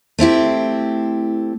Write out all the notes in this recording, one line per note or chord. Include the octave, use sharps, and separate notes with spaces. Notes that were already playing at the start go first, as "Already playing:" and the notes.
A3 C4 E4 G4